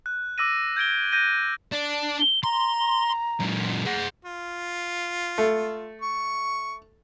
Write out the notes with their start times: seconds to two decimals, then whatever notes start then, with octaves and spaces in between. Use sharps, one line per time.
0.06 F#6
0.38 D6 E6 A#6 D#7
0.76 G6 G#6 D7 G7
1.12 F#6 G6 A#6 D#7
1.72 D4
2.20 G7
2.43 A#5 C6
3.40 F#2 A#2
3.86 G#4 F#5
4.25 F4
5.38 A3
6.02 C#6